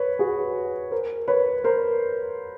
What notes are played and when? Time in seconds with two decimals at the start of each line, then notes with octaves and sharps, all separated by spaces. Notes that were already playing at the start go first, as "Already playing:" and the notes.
Already playing: B4 C#5
0.19 F#4 G#4
0.91 A#4 C5
1.28 B4 C#5
1.64 A#4 C5